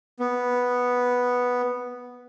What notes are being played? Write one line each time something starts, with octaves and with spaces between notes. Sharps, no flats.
B3